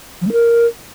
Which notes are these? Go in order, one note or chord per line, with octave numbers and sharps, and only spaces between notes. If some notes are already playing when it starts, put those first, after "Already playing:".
F3
A3
A#4